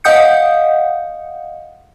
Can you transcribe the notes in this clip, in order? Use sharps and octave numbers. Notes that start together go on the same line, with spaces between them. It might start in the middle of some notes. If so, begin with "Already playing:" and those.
D#5 F5 F#5 D#6 G6 C#7